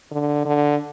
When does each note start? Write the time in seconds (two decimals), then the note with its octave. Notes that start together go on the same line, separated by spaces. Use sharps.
0.11 D3
0.46 D3